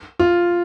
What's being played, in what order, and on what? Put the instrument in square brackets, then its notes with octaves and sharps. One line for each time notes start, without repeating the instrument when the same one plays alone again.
[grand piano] F4